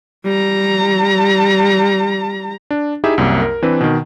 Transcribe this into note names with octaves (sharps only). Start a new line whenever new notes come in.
G3 A#5
D4
D#4 E4 G4 G#4 E5
C2 F#2 C3 A#3
A#4
E3 C4 D4 B4
B2 D#3